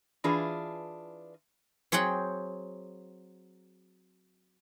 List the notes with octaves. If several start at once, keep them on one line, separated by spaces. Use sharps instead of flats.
E3 D4 F4 G#4 B4
F#3 C4 G#4 F#5 G5